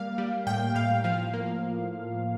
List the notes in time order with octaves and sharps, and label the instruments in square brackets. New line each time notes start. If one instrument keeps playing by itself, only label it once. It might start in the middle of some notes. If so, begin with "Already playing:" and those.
Already playing: [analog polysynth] G3 A#3 F5
G3
A2 G5
A2 F5
F3 F5
A#3